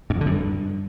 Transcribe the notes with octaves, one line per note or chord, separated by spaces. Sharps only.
G#2
F2
D3
F#2
G2